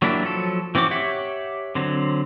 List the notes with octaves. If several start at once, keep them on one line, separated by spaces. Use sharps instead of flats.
F#3 A#3 D4 E4 G4
F3 F#3 A4
E3 C4 C#4 F#4 D6
G4 C#5 E5 F#5
D3 F#3 C4